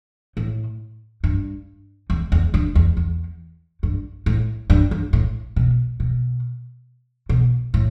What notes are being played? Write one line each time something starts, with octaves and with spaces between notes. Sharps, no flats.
A2
G2
E2
E2
G2
E2
E2
G2
A2
G2
G2
A2
B2
B2
B2
A2